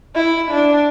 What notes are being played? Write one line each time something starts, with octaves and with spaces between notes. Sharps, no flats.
E4
D4